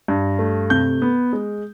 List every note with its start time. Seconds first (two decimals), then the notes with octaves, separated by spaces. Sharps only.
0.08 G2
0.39 A3
0.70 C3 G6
1.02 B3
1.33 G#3